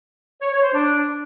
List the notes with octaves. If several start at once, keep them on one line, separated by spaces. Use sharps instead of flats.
C#5
C#5
C5
D4